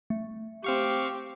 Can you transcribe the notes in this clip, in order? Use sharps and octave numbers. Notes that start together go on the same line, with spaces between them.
A3
C4 G4 F5 C#6